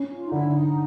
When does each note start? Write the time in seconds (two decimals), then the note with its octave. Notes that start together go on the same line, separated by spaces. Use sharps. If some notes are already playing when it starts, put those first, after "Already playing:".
Already playing: C#4
0.10 F4
0.24 D#4
0.32 D3 E4
0.48 E4
0.53 D#4